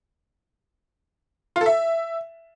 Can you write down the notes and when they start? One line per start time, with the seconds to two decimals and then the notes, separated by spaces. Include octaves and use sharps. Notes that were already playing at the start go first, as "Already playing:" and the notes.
1.56 F4
1.61 A4
1.66 E5